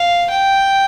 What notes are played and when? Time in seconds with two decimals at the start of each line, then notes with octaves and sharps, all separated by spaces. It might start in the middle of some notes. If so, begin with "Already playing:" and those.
Already playing: F5
0.30 G5